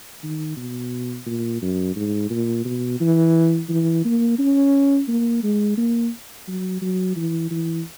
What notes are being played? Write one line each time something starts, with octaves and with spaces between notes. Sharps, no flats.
D#3
B2
A#2
F#2
G#2
A#2
B2
E3
E3
A#3
C#4
A#3
G#3
A#3
F#3
F#3
E3
E3